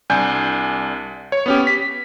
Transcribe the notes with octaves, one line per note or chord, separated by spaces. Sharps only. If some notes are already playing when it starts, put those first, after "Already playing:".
C2 D4 G#5 G6
C#5
B3 C#4 G4
B6